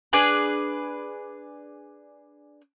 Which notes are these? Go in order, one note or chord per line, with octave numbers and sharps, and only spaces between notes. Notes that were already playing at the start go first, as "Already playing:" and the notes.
D4 G#4 B4